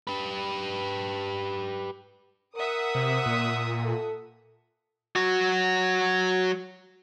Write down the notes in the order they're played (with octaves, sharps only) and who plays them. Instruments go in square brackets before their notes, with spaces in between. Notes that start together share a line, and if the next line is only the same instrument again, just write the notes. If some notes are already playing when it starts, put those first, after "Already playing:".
[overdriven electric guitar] G4 B4
[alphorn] A#4 [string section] E5 F#5 D#6
[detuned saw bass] C3
A#2
[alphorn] A4
[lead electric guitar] F#3 F#4